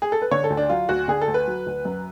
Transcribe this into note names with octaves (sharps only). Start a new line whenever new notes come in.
G#4
A4
B4
D3 C#5
A4
D2
D4
F#3 F4
D2 F#4
D3 G#4
A4
D2
B4
F#3
D2
F#2